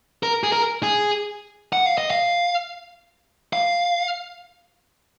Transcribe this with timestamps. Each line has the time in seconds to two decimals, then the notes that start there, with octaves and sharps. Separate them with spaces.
0.23 A#4
0.43 G#4
0.52 A#4
0.83 G#4
1.73 F#5
1.86 F5
1.98 D#5
2.11 F5
3.53 F5